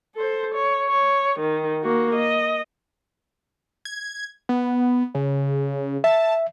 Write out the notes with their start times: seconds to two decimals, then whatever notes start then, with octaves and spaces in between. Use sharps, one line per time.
0.15 A4 C5
0.55 C#5
0.89 C#5
1.40 D#3
1.81 A#3 F#4
2.15 D#5
3.85 G#6
4.49 B3
5.15 C#3
6.04 E5 A5